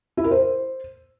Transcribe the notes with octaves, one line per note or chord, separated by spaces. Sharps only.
E4
A#4
C5